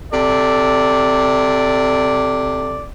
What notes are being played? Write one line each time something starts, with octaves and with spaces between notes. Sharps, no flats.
C3 A4 D5